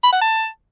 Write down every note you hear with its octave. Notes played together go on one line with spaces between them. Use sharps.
B5
F#5
A5